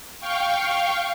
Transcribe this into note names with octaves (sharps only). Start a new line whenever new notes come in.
F5 G5 C#6